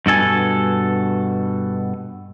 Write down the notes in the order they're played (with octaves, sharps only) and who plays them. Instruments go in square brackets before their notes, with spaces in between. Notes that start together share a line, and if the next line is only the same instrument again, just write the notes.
[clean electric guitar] G2 B2 A4 G#5